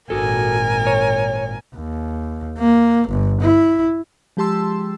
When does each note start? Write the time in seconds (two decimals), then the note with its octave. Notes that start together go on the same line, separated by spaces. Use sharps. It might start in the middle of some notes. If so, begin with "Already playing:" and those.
0.10 G#1 A#2 F#4 A4 A#4 G#5
0.87 C#5
1.75 D#2
2.58 A#3
3.09 G1
3.42 E4
4.37 F3 G#3 G4 A5 C6 E6